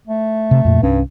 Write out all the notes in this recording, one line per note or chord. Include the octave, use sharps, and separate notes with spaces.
A3
C3
F2 A#2
C2 G2 C#4